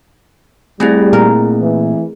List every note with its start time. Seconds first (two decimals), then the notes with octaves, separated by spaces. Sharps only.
0.80 G3 A3 C4 E4 G#4
1.13 A#2 A#4
1.60 E3